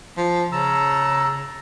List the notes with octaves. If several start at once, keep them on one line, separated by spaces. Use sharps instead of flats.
F3
C#3 A5 A#5 E6